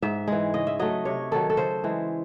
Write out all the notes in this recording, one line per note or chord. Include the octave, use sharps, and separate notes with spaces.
G#2 E5
E3 G#3
C#3 D#5
E5
F#3 A3 D#5
C3 C#5
D#3 F#3 A4
A4
C#3 C5
E3 G#3